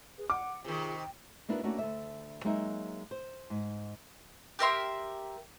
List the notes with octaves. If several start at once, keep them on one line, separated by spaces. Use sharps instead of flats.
G#4 B4
F#5 D6
C3 D#3 F4 G#4
G5
A#3 B3 D4 E4 F#4 A#4
A3 A#3 C#4 D4 F#4
D2 A4 E5
F#3 G#3 A#3 D#4 D#5 E5
C5
G#2
G4 A#4 E5 C6